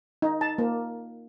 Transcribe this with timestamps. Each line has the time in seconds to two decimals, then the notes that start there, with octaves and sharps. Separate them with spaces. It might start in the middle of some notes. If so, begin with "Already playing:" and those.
0.22 D#4
0.41 A5
0.58 A#3